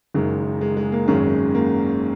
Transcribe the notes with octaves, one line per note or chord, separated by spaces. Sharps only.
F#1 F#2 D#3 G#3
G#3
G#3
A#3
G#1 F#2 C#3 G#3
A#3